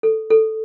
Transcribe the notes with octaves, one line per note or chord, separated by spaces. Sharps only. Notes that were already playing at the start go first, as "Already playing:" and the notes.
A4
A4